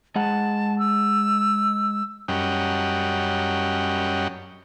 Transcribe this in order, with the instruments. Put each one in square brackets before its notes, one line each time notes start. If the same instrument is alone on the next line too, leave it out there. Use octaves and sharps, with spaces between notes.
[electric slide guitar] G#3 G#4 F#5 [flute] A5
[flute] E6
[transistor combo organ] F#2 G3 C#4 D#5 F#5 G5